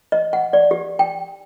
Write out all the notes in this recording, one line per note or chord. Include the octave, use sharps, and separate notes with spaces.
D#5
F#5
D5
G4
G5